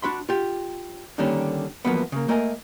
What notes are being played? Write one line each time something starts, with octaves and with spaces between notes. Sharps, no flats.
D4 F#4 B5 C6
F4 G4
D3 D#3 G3 A#3 C#4 D4
E2 F3 F#3 A#3 B3
C#3 A#3
A3 A#3 A#4 D#5 G#5